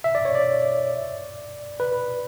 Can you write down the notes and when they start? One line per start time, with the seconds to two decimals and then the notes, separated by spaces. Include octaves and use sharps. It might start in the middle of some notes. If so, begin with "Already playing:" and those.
0.04 E5
0.15 D5
0.25 C#5
0.35 D5
1.80 B4